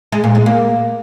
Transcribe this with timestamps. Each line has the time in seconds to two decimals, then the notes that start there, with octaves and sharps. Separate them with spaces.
0.12 G#3
0.24 A#2
0.35 G#3
0.46 A#3